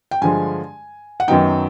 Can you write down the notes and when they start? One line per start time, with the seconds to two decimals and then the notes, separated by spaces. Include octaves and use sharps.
0.11 G5
0.22 G2 D3 F3 G#3 G#5
1.20 F#5
1.28 F#2 D#3 F#3 B3 D#4 G5